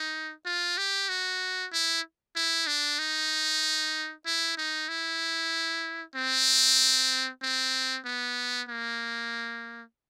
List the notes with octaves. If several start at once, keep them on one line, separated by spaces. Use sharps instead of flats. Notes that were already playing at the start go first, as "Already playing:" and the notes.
Already playing: D#4
F4
G4
F#4
E4
E4
D4
D#4
E4
D#4
E4
C4
C4
B3
A#3